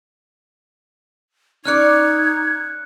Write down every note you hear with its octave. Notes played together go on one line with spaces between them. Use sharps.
C#4 D#4 D5 F6 F#6 G#6 C#7